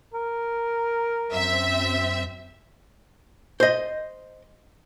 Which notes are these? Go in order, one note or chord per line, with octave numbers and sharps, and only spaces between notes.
A#4
F#2 C4 E5
C5 D#5